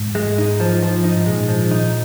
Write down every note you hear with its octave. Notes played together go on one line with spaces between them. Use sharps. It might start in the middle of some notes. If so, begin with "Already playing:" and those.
Already playing: G#2
G#3
D#4
F3
F3
D#4
G#2
A#2 G#3
F3
D#3
D#4